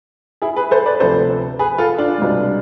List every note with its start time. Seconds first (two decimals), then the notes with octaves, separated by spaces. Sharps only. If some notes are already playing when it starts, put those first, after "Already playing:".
0.42 E4 G#4
0.56 G#4 B4
0.71 A4 C5
0.86 B4 D5
1.00 D2 C3 F3 B3 A4 C5
1.59 G#4 B4
1.78 F4 A4
1.98 D4 F4
2.18 C2 B2 G#3